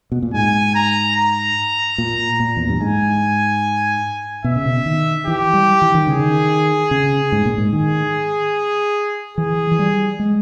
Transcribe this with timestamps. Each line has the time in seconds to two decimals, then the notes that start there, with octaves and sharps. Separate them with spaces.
0.12 B2
0.23 A#2
0.34 G#2 G#5
0.75 A#5
1.16 A#5
1.98 A#2
2.40 A#2
2.57 E2
2.68 G2
2.80 G#2 G#5
4.44 B2 E5
4.56 C#3
4.65 B2
4.86 D#3
5.27 E3 G4
5.54 G3
5.82 E3
5.95 D#3
6.07 C#3 G#4
6.20 D#3
6.91 C#3
7.32 G#2
7.46 A#2
7.58 G#2
7.73 D#3 G#4
9.37 E3 G#4
9.71 E3
9.79 G3
10.19 G#3